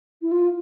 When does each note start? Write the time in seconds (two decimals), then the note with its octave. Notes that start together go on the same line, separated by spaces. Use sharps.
0.22 E4
0.31 F4